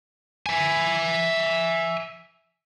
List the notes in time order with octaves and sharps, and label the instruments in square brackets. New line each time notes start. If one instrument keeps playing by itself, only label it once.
[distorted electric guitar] E5 G#5